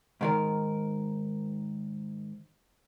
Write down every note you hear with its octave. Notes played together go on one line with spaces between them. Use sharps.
G#2 D#3 A#4